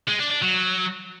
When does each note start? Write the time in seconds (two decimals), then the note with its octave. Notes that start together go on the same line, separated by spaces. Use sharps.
0.08 G#3
0.20 D4
0.31 D4
0.42 F#3